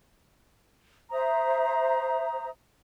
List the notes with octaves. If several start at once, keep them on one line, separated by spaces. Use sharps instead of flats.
C5 E5 A#5 D#6